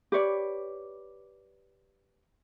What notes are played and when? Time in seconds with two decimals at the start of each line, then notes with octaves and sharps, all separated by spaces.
0.12 G4 B4 C#5 D5